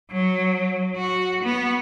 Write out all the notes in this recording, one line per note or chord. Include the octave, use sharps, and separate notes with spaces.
F#3
F#4
B3